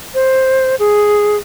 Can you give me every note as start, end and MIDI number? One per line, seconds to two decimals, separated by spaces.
0.14 0.75 72
0.79 1.37 68